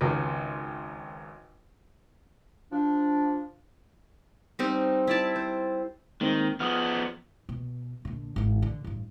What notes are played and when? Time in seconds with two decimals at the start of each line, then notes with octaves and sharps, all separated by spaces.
0.01 G#1 C#2
2.72 F3 D4
4.59 G3 C4 D#4
5.07 E4 D5 A5
5.36 C5
6.21 D#3 G#3 A#3 C4
6.60 F3 B3 D#6 F6
7.49 B2
8.05 A#1 D3
8.36 G#1 E3
8.62 D3
8.84 A1 G2